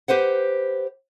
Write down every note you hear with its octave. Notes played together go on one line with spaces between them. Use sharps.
G4 B4 C5 F#5